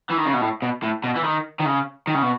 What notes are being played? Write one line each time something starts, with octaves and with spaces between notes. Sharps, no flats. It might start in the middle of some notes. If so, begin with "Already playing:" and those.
E3
D#3
C#3
B2
A2
B2
A2
B2
E3
D#3
D#3
C#3
D#3
C#3
B2